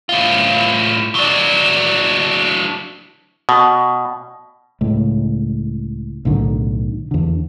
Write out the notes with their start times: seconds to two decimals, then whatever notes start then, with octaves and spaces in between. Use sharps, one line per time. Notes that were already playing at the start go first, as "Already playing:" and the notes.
0.09 A2 F4
1.15 F#3 D4
3.49 B2
4.81 C#2 A2
6.25 B1 A2 D3 D#3
7.11 E2 D3